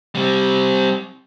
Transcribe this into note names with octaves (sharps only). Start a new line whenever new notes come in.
G3 C4